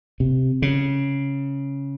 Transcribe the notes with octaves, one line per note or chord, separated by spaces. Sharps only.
C3
C#3